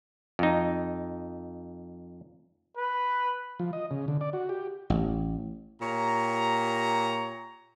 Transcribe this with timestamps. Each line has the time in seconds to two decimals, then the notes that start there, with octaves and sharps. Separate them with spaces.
0.39 F2 D#4
2.77 B4
3.59 F3
3.73 D#5
3.91 C#3
4.08 D3
4.21 D5
4.33 F#4
4.49 G4
4.90 A1
5.80 A#2 G4 C#5 A#5